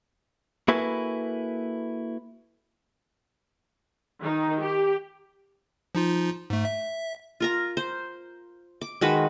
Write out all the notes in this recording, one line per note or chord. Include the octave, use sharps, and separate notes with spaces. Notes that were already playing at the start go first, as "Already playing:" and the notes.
A#3 E4 F#4 A4 B4 G#5
D#3 D#4
G4
F3 D#4 F4
G#2 A3
E5
F4 A#4 A#5
C5
D6
D#3 G#3 F#4 B4